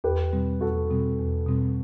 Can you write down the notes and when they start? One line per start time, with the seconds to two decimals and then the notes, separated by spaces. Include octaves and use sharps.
0.04 E2 G4 B4
0.33 B2 G3 C4
0.61 E2 F#4 A4
0.90 B2 G3 C4
1.19 E2
1.47 B2 G3 C4